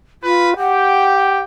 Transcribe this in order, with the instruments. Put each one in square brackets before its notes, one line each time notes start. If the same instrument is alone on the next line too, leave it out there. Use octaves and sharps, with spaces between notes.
[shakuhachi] F4 [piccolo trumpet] B4
[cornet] G4 [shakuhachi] F#5 [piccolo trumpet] G5